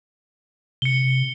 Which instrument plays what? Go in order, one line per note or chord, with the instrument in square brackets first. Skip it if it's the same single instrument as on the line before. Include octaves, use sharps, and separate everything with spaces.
[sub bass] C3 [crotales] C#7 G7